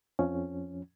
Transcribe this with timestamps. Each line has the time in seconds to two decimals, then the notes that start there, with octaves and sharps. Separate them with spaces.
0.19 F2 F3 C#4